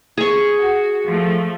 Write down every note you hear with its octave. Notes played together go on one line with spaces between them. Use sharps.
G#4 C#6
F#4
F3 A3